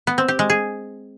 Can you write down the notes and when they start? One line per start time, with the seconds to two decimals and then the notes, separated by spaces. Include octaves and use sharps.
0.07 B3
0.18 C4
0.28 G4
0.39 G#3
0.50 G#4